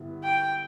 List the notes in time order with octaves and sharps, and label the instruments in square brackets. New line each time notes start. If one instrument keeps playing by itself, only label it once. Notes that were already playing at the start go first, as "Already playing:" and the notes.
Already playing: [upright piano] G2 D3 G3 B3 E4
[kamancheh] G5